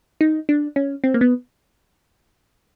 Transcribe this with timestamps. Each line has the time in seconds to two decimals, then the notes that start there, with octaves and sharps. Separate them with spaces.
0.21 D#4
0.49 D4
0.76 C#4
1.04 C4
1.14 A#3
1.21 B3